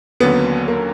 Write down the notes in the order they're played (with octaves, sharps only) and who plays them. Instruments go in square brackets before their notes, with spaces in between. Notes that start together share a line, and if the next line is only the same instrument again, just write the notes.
[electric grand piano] D#2 D3 F#3 A#3 C#4 [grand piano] B3
[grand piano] A#3